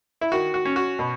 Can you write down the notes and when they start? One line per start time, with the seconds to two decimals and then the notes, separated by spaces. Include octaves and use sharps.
0.21 E4
0.32 D#3 F#4
0.54 F#4
0.65 C#4
0.76 F#4
0.99 B2